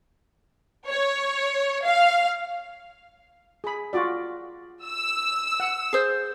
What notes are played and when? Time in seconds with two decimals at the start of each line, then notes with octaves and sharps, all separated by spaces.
0.88 C#5
1.85 F5
3.64 G#4 B5
3.93 F4 F#4 D5
4.85 E6
5.60 F#5
5.93 G#4 C5